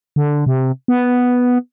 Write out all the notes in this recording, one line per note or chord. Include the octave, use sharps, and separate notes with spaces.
D3
C3
B3